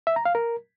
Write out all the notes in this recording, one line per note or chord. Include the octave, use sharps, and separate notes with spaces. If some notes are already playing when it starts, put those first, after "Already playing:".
E5
A#5
F5
A#4